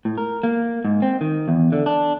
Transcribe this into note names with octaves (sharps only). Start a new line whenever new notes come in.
A2
A#4
A#3
G#2
C4
D#3
E2
D3
D4